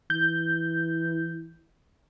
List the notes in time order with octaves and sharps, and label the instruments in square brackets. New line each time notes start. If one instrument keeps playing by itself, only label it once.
[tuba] E3 [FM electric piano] G6